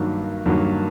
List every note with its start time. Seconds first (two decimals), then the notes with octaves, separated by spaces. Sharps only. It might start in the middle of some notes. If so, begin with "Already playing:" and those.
Already playing: G2 D#3 F#3 A#3
0.46 G2 D#3 F#3 A#3